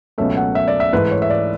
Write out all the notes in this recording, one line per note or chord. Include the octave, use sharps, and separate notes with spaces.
C#2 B2 F#3 A3 C#4 E5
F#5
E5
D5
E5
G#2 E3 A3 B4
C#5
E5
D5